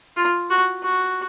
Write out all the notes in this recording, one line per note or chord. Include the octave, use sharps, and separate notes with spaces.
F4
F#4
F#4